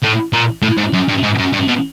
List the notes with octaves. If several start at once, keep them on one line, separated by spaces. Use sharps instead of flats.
A2
A#2
A2
G#2
F#2
G2
G#2
F#2
G2
B2